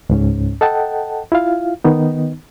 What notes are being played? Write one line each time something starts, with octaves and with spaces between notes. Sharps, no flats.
C#2 G#2 C#4
A4 D#5 F#5 G5 A5
E4 F4 F5
D#3 B3 D#4